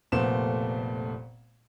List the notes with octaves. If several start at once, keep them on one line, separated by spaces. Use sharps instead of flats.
F1 A#2 A3 B3 C5 E7